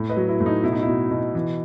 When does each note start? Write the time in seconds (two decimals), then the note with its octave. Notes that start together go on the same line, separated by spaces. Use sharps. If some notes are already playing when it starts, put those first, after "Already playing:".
Already playing: A2
0.09 B4 D#5
0.17 F#3
0.28 E4
0.40 A2
0.46 D#4
0.63 B2 E4
0.72 D#4
0.82 B2 E4
1.11 B2
1.35 E3